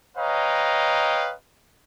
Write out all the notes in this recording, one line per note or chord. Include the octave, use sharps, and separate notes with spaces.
B4 C#5 D#5 F5 G5 A#5